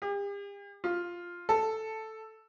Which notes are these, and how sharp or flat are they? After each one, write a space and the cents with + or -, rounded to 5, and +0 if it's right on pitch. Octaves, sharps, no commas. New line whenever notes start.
G4 +45
F4 +0
A4 +0